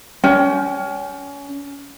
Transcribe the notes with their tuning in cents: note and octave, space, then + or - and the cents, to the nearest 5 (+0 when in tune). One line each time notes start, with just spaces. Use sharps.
C#4 +25 G5 -10